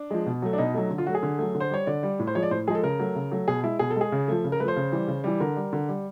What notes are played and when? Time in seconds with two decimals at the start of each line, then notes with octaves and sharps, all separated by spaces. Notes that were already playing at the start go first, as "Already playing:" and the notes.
Already playing: D4
0.10 F3 G#3
0.26 B2
0.42 F#3 A3
0.53 D4
0.58 B2 D#4
0.74 F#3 A3 D#4
0.90 D3
0.98 F4
1.06 F#3 F#4
1.09 A3
1.15 G#4
1.23 D3
1.38 F#3 A3
1.55 D3
1.60 C5
1.70 G3 C#5
1.87 D3 D5
2.03 G3
2.19 A2
2.27 C5
2.35 F3 G#3 C#5
2.43 D5
2.51 A2 C5
2.67 F3 G#4
2.70 G#3 A4
2.83 C#3 A#4
2.99 F#3 A3
3.15 C#3
3.31 F#3 A3
3.48 B2 G#4
3.63 G#3 E4
3.79 B2 G#4
3.90 A4
3.96 G#3
4.01 G#4
4.12 C#3
4.28 F3 A3
4.44 C#3
4.52 A#4
4.60 A3 B4
4.64 F3 C5
4.76 C#3
4.92 E3 G3
5.08 C#3
5.24 E3 G3
5.40 D3 A#4
5.56 G3
5.73 D3
5.89 G3